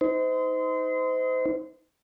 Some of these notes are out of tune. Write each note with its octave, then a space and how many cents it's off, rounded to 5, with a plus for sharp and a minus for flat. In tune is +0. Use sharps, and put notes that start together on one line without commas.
D#4 +30 C5 -30